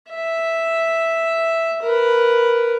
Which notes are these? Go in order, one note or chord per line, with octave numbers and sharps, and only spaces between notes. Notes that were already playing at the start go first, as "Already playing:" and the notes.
E5
A#4 B4